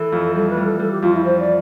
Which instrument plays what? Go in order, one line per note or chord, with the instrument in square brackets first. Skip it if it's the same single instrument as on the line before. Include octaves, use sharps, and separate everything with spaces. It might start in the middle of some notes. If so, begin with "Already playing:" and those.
Already playing: [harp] E3 [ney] A4
[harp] F2
[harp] G3 [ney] A4
[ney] B4
[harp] G3
[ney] A4
[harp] G3 [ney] A4
[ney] G4
[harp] F2 [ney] F4
[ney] E4
[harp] E3 [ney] C5
[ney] D5